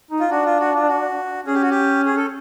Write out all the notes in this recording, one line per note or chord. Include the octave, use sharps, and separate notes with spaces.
D#4
F4
D4 F#4
F4
F#4
F4
F#4
C#4 G#4
G4
F#4
G4
G#4
A4